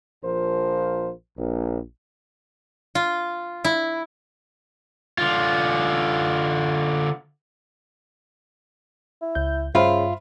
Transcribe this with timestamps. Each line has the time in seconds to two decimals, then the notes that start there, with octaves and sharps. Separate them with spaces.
0.23 A#1 F3 F4 A#4 C5
1.38 A#1
2.95 F4
3.65 E4
5.18 D3 F4
9.22 E4
9.35 C#2 G6
9.75 G2 C#3 F4 C5 E5 B5